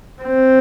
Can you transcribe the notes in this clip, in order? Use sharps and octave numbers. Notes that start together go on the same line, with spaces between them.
C4